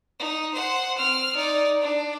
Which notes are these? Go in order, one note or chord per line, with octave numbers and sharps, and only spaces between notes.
D#4
C5 F#5
C4 F6
D#4 D5
D4